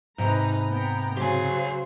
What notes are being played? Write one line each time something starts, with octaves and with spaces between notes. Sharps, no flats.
G#2 C3 D#4 B4 A#5
B3 G5 A#5
C#3 F#3 G4 C5 G#5